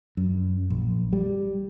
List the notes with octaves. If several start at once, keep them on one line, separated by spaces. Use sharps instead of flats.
F#2
A#1
G3